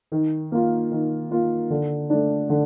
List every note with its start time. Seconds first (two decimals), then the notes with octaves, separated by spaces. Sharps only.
0.12 D#3
0.52 A#3 F4
0.91 D#3
1.31 A#3 F4
1.70 D3
2.10 A3 D4
2.50 D3